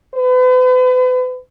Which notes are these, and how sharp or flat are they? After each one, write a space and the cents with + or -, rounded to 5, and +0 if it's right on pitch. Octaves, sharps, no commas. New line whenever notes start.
B4 +40